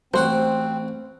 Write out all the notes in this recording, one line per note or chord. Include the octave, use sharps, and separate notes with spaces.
A1 C4 F#4 C5 F#5